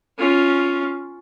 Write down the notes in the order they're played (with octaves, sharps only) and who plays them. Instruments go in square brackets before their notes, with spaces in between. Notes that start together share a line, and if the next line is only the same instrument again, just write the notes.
[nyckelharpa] C#4 F4